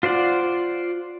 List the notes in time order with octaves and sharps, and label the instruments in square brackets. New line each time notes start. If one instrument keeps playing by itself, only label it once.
[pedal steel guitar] F4 C5 D5 F#5